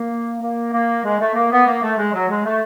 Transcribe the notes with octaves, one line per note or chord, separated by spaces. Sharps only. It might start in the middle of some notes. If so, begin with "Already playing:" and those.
Already playing: A#3
A#3
A#3
G#3
A3
A#3
B3
A#3
A3
G#3
F#3
G#3
A3